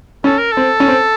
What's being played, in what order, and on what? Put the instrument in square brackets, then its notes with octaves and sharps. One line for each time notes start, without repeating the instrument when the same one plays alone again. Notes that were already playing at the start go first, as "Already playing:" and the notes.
[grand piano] C#4 [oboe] A4
[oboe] A#4
[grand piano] C4 [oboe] A4
[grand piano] C#4
C4